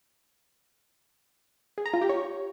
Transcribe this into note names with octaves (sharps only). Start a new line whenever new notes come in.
G#4
A#5
F4
G4
C#5